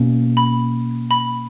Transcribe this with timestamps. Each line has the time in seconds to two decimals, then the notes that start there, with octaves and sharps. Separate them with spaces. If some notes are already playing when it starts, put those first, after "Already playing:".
Already playing: B2 A#3 C#4
0.37 B5
1.11 B5